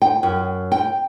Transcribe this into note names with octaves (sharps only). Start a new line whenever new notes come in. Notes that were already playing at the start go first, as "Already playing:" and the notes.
G5
F#2
G5